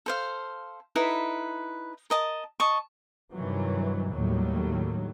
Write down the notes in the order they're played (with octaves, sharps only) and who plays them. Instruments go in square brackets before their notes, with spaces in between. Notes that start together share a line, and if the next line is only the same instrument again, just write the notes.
[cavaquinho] A4 C5 F5
D#4 E4 A4 B4
A#4 D#5 A5
D#5 A5 C#6
[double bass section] G2 C3 D#3 E3 F#3
D#2 A2 F#3 G3